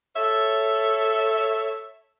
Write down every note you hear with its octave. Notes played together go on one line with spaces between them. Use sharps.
A4 C#5 E5